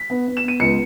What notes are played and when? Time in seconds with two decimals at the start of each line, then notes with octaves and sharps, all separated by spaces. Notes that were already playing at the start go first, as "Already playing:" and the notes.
Already playing: B6
0.10 B3
0.27 B3
0.37 E7
0.44 B3 D#7
0.60 C#2 C#7